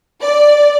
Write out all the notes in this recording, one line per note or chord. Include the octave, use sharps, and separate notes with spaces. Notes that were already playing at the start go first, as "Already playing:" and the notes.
D5